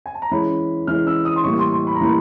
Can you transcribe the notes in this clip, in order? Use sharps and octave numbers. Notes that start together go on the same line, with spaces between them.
G#5
A5
A#5
E3 G#3 C#4 B5
E3 G#3 C#4 F6
E6
D#6
C6
A2 E3 G3 A#3 C#6
C6
C6
B5
A#5
A2 E3 G3 A#3 B5